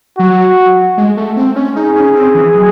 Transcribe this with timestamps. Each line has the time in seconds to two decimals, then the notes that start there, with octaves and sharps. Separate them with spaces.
0.18 F#3 F#4
0.98 G#3
1.17 A3
1.37 C4
1.56 C#4
1.76 D#4 G#4
1.95 C#4
2.15 C4
2.35 E3
2.54 F#3